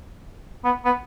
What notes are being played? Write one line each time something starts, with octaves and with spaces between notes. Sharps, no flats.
B3
B3